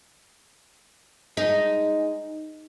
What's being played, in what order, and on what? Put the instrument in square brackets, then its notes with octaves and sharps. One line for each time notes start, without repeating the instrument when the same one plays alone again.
[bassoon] G#3 [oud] D#4